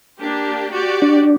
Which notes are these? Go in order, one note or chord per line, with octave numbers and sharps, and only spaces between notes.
A#3 D4 G4
F#4 G4 D5
D4